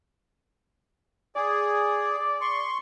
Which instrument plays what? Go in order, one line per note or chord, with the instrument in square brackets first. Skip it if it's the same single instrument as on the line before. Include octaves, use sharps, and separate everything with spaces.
[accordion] G#4 [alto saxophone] D5
[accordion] C6 C#6